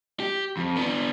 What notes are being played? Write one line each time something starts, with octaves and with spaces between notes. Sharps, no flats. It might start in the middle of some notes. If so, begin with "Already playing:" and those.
G4
F2
B3 D4